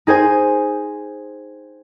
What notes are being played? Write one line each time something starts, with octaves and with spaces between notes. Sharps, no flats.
D#4 G#4 C5 G#5